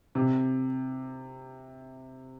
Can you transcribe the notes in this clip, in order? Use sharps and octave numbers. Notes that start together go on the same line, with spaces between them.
C3